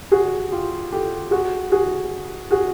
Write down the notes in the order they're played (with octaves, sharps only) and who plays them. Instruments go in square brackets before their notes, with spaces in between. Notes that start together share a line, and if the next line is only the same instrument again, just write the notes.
[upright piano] F#4 G#4
F4 G4
G4 A4
F#4 G#4
F#4 G#4
F#4 G#4